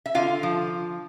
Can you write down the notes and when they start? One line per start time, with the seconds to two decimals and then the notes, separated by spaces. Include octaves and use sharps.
0.06 E5
0.15 D3 F4 F5
0.43 F3